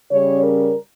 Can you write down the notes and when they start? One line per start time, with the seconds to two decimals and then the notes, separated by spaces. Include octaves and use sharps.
0.11 C#3 G3 C#4 C#5
0.42 A#4